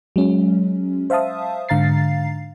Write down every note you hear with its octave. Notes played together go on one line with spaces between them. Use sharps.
F#3 G#3 C#4
C5 E5 F5 A5 D#6
G#2 D3 F5 A#5 A6 C7